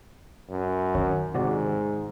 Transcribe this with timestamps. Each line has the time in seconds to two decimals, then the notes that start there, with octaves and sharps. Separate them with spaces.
0.50 F#2
0.95 D#3 C#4
1.35 G#2 C3 F#4 D5